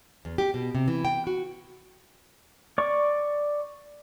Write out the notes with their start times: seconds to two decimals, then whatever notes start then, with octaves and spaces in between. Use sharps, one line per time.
0.25 E2
0.38 G4
0.54 B2
0.75 C3
0.88 E3
1.05 G5
1.27 F#4
2.78 D5 C#6